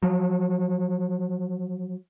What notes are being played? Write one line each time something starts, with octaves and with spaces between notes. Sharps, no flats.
F3 F#3